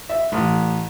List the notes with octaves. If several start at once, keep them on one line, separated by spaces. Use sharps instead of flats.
E5
A1